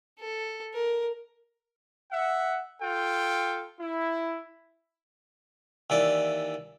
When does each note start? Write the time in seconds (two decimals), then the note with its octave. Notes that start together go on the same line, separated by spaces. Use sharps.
0.20 A4
0.74 A#4
2.12 E5 F#5
2.82 F4 A4 G5
3.80 E4
5.90 D#2 E3 D5